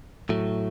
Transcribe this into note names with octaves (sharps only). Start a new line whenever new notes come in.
A2 F#3 A3